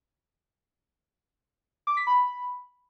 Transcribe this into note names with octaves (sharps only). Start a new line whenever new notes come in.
D6
B6
B5